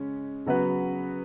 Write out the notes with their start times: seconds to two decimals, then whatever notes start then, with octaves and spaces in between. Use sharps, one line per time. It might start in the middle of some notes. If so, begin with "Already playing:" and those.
Already playing: C#3 G#3 C#4
0.46 C#3 F#3 B3 F#4 B4